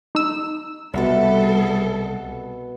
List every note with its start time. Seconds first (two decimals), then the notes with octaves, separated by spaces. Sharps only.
0.15 D#4 E6
0.94 C2 B2 G3 B3 A4 E5